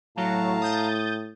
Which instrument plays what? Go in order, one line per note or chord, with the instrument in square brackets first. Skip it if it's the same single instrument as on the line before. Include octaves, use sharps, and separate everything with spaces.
[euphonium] A2 [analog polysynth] F#3 [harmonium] F5 A5 A#5
[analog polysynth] D#6 G6 A6